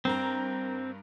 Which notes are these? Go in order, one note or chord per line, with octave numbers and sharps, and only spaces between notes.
G2 C4 A#4 A#5